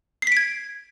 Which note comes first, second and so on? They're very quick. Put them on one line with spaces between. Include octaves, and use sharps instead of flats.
C7 B6 D7 G#6